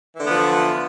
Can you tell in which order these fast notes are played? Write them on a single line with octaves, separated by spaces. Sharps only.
E3 D3 A3 B3 F3